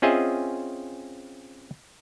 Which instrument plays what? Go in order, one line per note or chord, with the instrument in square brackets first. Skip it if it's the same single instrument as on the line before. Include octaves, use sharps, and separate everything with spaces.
[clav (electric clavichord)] C4 C#4 F4 G#4 D#5 E5